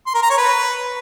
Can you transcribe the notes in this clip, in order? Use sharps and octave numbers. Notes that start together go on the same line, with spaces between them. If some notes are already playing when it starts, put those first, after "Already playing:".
C6
A#4
A#5
C#5
B4